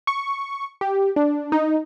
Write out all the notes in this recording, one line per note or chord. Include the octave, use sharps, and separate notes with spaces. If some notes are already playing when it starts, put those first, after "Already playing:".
C#6
G4
D4
D#4